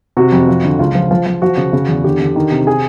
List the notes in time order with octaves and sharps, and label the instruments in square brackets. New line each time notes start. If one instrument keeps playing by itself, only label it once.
[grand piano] C3 F#4
F2
F3
D3
C#2 F4
F3
F3
F3
F3 F#4
C#3
C#3
E2
D3 G4
D3
D#3
C3
G#4